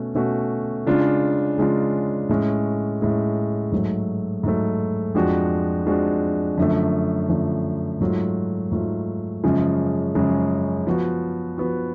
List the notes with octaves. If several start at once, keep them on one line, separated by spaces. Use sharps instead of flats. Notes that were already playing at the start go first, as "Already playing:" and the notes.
Already playing: B2 A3 C#4 F#4
B2 A3 C#4 F#4
C#3 G#3 D4 F4
C#3 G#3 D4 F4
A2 G#3 C#4
A2 G#3 C#4
G#2 F#3 A3
G#2 F#3 A3
F2 F3 G#3 D4 F#4
F2 F3 G#3 D4 F#4
F#2 D3 F3 A3
F#2 D3 F3 A3
G#2 F#3 A3 F4
G#2 F#3 A3 F4
F#2 C#3 F3 G#3
F#2 C#3 F3 G#3
F3 B3 F#4
F3 B3 F#4